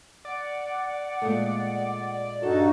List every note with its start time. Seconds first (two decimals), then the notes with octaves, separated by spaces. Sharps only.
0.25 D5 F#5
1.22 A#2 G#3 A3
2.43 G2 D#4 F#4 A4